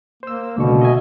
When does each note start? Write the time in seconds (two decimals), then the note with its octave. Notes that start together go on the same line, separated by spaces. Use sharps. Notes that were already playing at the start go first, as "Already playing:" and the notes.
0.23 A#3 C5 E6
0.58 C#2 B2 D3 C#6
0.81 D#5 E5 G#5